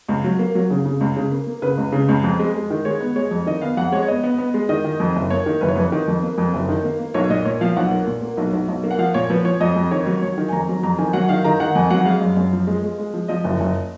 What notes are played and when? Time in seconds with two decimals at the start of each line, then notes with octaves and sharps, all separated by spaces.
0.09 C#2
0.24 F#3
0.39 A#3
0.55 F#3
0.70 C#3
0.86 C#3
1.01 C#2
1.17 C#3
1.31 A#3
1.47 A#3
1.62 C#3 B4
1.77 C#2
1.92 C#3
2.09 C#2
2.24 F2
2.39 G#3
2.54 G#3
2.70 D#3
2.85 G#3 C#5
3.00 B3
3.16 G#3 C#5
3.31 F2
3.47 D#3 D#5
3.61 B3 F5
3.77 F2 F#5
3.92 G#3 C#5
4.03 C#5
4.08 B3 D#5
4.24 B3
4.38 B3
4.54 G#3
4.69 D#3 D#5
4.85 D#3
5.00 F2
5.16 F#1
5.30 A#3 C#5
5.46 D#3
5.61 F#1 B4
5.68 C#5
5.76 F2 B4
5.92 D#3
6.08 F2
6.22 A#3
6.38 F2
6.54 F#1
6.69 D#3
6.84 A#3
6.99 A#3
7.14 B1 C#5
7.30 A#2 D#5
7.45 A#2 C#5
7.61 F3 F5
7.76 B1 F#5
7.92 A#3
8.06 A#2
8.22 A#3
8.37 B1
8.53 B1
8.68 B1
8.84 A#3
8.91 F#5
8.98 F3 F5
9.14 A#2 C#5
9.30 F3 B4
9.45 F3 C#5
9.60 F2 D#5
9.76 F2
9.91 D#3 C#5
10.06 F#3
10.22 F#3 C#5
10.38 D#3
10.48 G#5
10.52 F2 A#5
10.68 F#3
10.83 F2 A#5
10.98 D#3 G#5
11.13 F#3 F#5
11.29 D#3 F5
11.44 D#3 A#5
11.60 D#3 F#5
11.75 F2 G#5
11.90 F#3 F#5
12.06 G#3 F5
12.21 F#2
12.36 F#2
12.53 F3
12.67 G#3
12.83 G#3
12.98 G#3
13.14 F3
13.28 F3 D#5
13.44 F#1
13.60 F#1